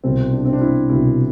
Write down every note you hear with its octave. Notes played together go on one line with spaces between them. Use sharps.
C2 B2 C4
D4
C4
D4
E4
C2 B2 E4